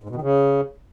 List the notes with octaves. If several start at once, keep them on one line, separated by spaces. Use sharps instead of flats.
G#2
B2
D#3
C#3